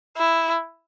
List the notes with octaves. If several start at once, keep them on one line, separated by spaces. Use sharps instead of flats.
E4